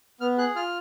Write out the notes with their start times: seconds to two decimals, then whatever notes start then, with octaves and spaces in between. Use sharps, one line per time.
0.21 B3 F6
0.38 G#4 F#6
0.56 F4 F6